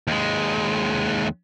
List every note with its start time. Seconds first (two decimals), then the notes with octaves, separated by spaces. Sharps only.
0.07 D#2 G#3